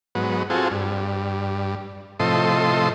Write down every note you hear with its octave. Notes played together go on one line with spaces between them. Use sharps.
G#2 F#3 B3
C4 F4 F#4 G#4 A4
G2
A2 C3 F3 A4 D#5 C6